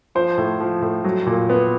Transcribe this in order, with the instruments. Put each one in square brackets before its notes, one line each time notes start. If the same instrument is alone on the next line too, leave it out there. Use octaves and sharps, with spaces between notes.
[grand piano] F3 C5
A2
F3
A2
F#3
A#2
B3